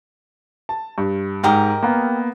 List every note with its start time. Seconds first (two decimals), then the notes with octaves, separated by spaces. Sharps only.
0.69 A5
0.98 G2
1.44 G#2 G4 A#4 D#5
1.83 A#3 B3